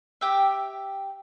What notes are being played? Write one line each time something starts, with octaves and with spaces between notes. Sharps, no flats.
G4 E5 G5